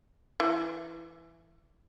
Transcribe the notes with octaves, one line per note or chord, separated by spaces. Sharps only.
E3